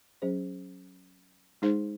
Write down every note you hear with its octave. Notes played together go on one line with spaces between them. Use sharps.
F#3 C#4 G#4 C5
G#3 D#4 G#4 C5